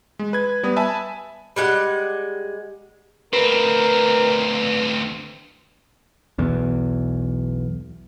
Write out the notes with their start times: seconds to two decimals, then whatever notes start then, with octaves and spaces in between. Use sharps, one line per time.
0.19 G#3
0.33 B4 G#6
0.63 G3 B3 B4 D#6
0.76 E5 G#5 A5 B5
1.56 G3 G#3 F#5
3.33 D2 C4 A#4 B4
6.38 B1 E2